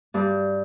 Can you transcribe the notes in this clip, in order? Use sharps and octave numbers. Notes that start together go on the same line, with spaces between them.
G2